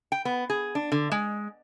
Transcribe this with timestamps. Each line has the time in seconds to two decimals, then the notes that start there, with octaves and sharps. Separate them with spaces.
0.12 G5
0.25 B3
0.50 G#4
0.75 D4
0.92 D3
1.12 G#3